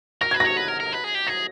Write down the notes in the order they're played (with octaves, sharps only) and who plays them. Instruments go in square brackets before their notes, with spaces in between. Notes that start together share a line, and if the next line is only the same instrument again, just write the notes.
[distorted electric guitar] A#4 [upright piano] A#6
[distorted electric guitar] B4 [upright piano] G#6
[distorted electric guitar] C#5 [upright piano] A#6
[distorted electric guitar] B4
A#4
A#4
B4
G#4
G4
[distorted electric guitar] G#4 [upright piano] A#6